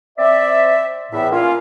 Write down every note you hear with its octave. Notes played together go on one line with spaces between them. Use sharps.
C4 D5 E5
E2 A2 E5
A#3 C#4 F4